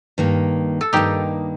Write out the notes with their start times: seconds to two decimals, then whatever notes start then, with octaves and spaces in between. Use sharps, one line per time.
0.18 G2 D#3 A#3
0.81 A4
0.93 G2 D#3 A#3 D#4 G4